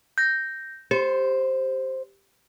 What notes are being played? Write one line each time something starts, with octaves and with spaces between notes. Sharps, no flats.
G6 A#6
G4 C5